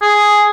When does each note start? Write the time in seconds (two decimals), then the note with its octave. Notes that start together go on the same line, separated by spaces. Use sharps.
0.02 G#4